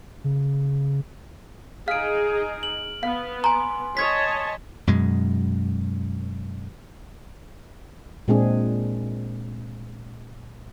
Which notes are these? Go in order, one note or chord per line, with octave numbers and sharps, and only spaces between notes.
C#3
D#4 G#4 F5 F6 D7
F#7
B3 F5
G#5 A#5 C6
C#5 D#5 A5 G#6 B6
F#2 B2 G#3
A#2 G#3 C4 D4 G#4